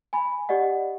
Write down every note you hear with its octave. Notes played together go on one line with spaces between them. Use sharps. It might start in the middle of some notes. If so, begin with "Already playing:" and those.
G#5 B5
G4 D5 D#5 F#5